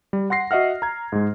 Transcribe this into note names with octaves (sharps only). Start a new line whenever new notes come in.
G3
F#5 C6 A#6 C7
F#4 D#5 E5 F#5 F6
A#5 G#6
G#2 G#3